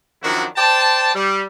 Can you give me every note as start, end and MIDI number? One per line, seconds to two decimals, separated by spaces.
0.22 0.44 42
0.22 0.44 51
0.22 0.44 53
0.22 0.44 62
0.22 0.44 64
0.22 0.44 66
0.57 1.12 72
0.57 1.12 74
0.57 1.12 79
0.57 1.12 81
1.15 1.42 55